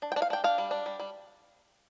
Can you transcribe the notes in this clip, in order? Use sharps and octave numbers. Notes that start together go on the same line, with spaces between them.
D4
G5
D4
F5
D4 G5
D4 F5
G3
D4
G3
G3